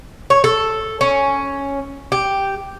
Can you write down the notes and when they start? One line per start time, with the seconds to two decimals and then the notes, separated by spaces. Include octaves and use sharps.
0.30 C#5
0.44 A4
1.01 C#4
2.12 G4